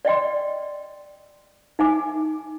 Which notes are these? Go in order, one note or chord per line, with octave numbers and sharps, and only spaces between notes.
D5 D#5 G5 C6
D#4 E5 G#5 D6